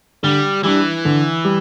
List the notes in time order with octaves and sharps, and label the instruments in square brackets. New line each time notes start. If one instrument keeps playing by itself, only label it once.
[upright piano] D3 [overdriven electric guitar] G3
[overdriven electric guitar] E3 [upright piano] G3 D4
[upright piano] D3
G3